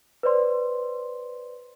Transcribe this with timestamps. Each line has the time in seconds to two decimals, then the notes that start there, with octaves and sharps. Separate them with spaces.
0.23 B4 C5 D5 C6